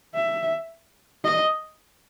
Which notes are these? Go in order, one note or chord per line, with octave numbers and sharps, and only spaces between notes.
E5
D#5